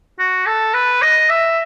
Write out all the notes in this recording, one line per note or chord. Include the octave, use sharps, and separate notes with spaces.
F#4
A4
B4
D#5
E5